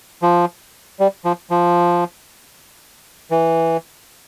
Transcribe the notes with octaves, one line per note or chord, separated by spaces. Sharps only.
F3
G3
F3
F3
E3